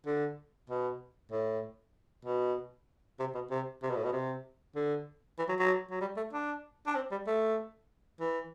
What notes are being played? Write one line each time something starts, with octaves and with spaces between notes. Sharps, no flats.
D3
B2
A2
B2
C3
B2
C3
C3
B2
A2
B2
C3
D3
E3
F#3
F#3
F#3
G3
A3
D4
D4
C4
G3
A3
E3